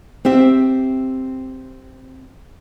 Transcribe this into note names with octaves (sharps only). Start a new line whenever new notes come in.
C4 G4 E5